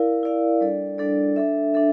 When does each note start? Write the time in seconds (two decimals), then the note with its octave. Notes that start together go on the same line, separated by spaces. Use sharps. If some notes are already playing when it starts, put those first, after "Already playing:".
Already playing: E4 A#4 D5 F5
0.23 E4 A#4 D5 F5
0.61 G3 D4 A4 D5
0.98 G3 D4 A4 D5
1.36 D4 A4 E5
1.74 D4 A4 E5